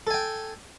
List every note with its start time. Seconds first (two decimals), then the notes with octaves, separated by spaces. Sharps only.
0.07 A4
0.10 G#5
0.14 G5